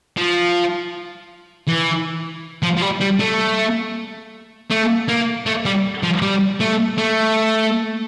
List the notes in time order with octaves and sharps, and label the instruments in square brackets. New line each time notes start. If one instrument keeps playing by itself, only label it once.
[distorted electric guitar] F3
E3
F3
F3
G3
G3
A3
A3
A#3
A3
G3
F3
G3
A3
A3